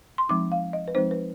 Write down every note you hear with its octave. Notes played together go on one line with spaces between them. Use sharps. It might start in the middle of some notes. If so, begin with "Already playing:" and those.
C6
F3 G#3 C4 D#4 D6
F5
D#5
B4
F3 G#3 C4 D#4 C5
B4